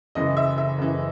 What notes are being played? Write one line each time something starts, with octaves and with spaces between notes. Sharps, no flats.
F#1 F#2 C#3 E3 D#5
E5
E5
F#1 F#2 C#3 E3